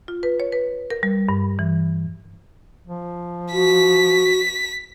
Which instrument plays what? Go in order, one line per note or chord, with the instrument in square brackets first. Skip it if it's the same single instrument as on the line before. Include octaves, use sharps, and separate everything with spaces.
[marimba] F4
B4
C#5
B4
A#4
G3
G2
E3
[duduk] F3
[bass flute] F#4 [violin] B6